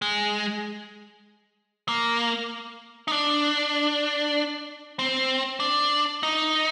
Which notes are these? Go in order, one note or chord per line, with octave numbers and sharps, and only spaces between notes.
G#3
A#3
D#4
D4
C4
D4
D#4